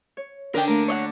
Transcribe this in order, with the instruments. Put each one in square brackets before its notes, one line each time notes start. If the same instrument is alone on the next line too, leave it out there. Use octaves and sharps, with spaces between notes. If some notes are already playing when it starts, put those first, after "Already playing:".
[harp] C#5
[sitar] D3 D4 [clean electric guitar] A#4 G5
[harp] A3 A#3 [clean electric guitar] A#4
[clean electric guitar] C#5 D#5 F#5